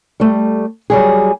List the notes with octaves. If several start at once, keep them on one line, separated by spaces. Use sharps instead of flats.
G3 A3
F#3 G3 G#4